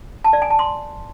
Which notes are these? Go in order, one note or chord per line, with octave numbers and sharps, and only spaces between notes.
A5
D5
G#5
A5
C6